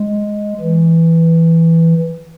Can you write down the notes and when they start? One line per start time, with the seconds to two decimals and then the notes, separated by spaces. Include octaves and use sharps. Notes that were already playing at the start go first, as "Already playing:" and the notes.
Already playing: G#3
0.60 E3